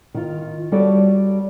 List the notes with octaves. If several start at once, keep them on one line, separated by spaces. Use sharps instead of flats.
D#3 F4
G3 F#4 A4 C#5 D5